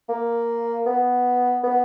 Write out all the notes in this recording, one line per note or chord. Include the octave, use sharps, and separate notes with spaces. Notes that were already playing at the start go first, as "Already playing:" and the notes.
A#3
B3
B3